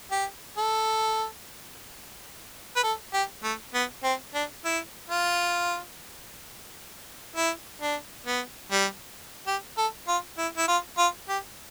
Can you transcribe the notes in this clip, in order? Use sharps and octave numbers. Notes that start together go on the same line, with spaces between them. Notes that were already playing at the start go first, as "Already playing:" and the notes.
G4
A4
B4
A4
G4
A3
B3
C4
D4
E4
F4
E4
D4
B3
G3
G4
A4
F4
E4
E4
F4
F4
G4